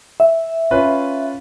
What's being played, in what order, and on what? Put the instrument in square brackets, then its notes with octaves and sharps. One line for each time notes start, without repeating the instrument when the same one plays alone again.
[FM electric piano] E5
[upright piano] C#4 F4 B4